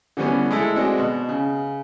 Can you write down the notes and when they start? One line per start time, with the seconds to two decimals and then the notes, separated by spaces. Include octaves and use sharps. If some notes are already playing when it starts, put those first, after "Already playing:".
0.17 D3 E3 G3 B3 C#4
0.51 G#3 A3 E4 A4
0.76 G#3 C4 D4 F#4
0.98 B2
1.29 C#3